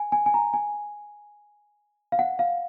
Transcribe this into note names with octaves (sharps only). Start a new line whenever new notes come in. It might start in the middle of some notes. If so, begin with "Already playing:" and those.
Already playing: G#5
G#5
G#5
A#5
G#5
F5
F#5
F5